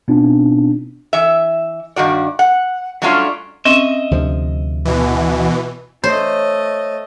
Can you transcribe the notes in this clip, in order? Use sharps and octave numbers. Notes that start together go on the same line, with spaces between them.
B2 B3 C4 D4 D#4 F4
E3 E5
G2 D#3 F#4 D5
F#5
F#3 G3 A3 C#4 D4 F4
C4 C#4 D#5 E5
D2 C3 F3
B2 E3
A3 C5 C#5 D#5